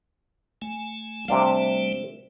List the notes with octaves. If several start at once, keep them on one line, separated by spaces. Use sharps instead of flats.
A3 G#5
C3 G3 A3 D4 F5